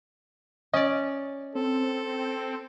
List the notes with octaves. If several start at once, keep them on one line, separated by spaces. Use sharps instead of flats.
C#4 D5 D#5
C4 A4